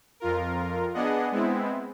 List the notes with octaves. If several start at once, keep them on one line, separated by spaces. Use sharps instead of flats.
F2 F4 A#4
B3 D4 G#4 D#5 F#5
G#3 B3 C4 E4